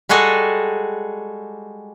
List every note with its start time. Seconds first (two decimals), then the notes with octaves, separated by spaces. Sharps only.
0.09 G3 G#3 F#4 G#4 A4